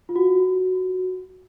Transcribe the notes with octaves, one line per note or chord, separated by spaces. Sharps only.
F4
F#4